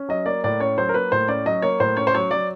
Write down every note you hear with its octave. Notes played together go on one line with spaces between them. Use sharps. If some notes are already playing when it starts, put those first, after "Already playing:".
Already playing: C#4
F#3 D#5
A#3 D5
A2 D5
C#4 C#5
F#3 C5
A#4
A#3 B4
A2 C5
C#4 D5
F#3 D#5
A#3 C#5
A2 C5
C#4 C#5
C5
F#3 C#5
F#3 D5